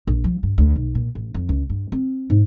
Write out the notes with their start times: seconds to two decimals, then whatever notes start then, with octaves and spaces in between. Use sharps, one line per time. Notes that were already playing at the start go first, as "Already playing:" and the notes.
0.07 A#1
0.24 F3
0.43 G2
0.58 D2
0.76 B1
0.95 A#2
1.15 A1
1.34 F2
1.49 C#2
1.70 G2
1.92 C4
2.30 G#2